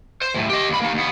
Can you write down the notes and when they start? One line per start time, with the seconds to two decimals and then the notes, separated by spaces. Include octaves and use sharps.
0.22 C5
0.34 D#2 A2
0.49 G4 D#5
0.69 D#2 B5
0.82 A#3 D#4
0.94 D#2 B3